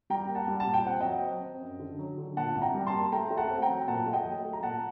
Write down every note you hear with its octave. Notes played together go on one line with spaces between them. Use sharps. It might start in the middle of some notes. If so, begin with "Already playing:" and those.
G3 G5 A#5
A#3
F#5 A5
G3
A5
A#2
G5
C4 F#5
F#3 D#5 G5
C4
C4
F#2
D3
F#3
D3
A#2 F#5 A5
C2
G5 A#5
G3
A5 C6
A#3
A3 G5 A#5
A3
F#5 A5
C4
G5 A#5
F#3
A#2 F#5 A5
A3
D#5 G5
F#3
A3
A#5
A#2 F#5 A5